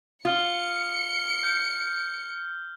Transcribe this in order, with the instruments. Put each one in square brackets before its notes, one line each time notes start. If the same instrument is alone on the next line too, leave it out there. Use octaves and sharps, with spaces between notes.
[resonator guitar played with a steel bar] F4 [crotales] D#6 F6 G7 [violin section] C#7
[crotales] F6 G6